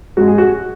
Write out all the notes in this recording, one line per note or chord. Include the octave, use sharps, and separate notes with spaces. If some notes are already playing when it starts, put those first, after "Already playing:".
G#2 G#3 F#4
G#4
F#4